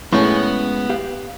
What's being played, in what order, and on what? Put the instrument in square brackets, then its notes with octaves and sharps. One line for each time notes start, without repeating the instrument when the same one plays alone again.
[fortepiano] A2 [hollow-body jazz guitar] G#3 C#4 G#4 [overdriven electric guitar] B3
[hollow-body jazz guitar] G4 F5